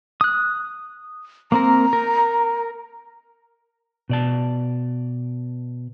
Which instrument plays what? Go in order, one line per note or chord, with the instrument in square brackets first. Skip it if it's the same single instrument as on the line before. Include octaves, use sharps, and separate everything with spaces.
[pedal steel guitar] D#6 F#6
[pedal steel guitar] A#3 C4 A#4 [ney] A#5
[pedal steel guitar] A#4
[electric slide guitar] B2 D5 A5